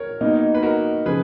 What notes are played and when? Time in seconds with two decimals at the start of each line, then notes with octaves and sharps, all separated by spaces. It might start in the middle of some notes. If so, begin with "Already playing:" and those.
Already playing: A#4 C#5
0.21 B2 A#3 D#4
0.54 B4
0.63 F#4 A#4
1.06 C#3 F3 G#4 B4